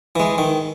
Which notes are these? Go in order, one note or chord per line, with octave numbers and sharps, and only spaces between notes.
E3 G#3
D#3